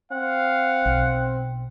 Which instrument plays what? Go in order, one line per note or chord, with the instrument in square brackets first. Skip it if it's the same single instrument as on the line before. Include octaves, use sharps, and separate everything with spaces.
[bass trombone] C4 [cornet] F5 [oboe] F#5
[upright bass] B1